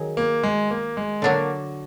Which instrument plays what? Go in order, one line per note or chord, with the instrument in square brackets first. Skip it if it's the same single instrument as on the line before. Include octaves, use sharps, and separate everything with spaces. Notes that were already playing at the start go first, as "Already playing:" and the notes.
Already playing: [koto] D#3 F#3 G#4
[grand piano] A#3
G#3
A#3
G#3
[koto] D3 F#3 D4 F#4 [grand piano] A#3